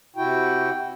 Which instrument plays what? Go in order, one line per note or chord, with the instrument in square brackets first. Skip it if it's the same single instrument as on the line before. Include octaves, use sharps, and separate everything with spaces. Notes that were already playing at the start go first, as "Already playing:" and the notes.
[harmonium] C3 E4 F#4 G5